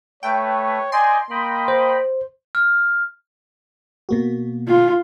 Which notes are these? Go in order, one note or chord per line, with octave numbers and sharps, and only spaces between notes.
A3 B4 C#5 G5
D5 D#5 G5 G#5 C6
A#3 D#5 G5 B5
C5
F6
B2 A#3 F#4
F4